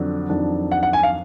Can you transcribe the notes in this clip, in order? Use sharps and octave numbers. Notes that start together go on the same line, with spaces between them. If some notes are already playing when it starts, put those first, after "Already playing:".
Already playing: F2 D3 F#3 D4
F2 D#3 F#3 D4
F#5
F#5
G#5
F5